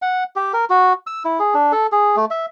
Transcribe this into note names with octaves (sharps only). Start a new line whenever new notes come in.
F#5
G4
A#4
F#4
E6
E4
G#4
D4
A4
G#4
A3
E5